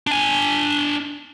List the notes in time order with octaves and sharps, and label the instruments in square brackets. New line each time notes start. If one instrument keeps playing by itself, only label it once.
[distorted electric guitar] D4 G#5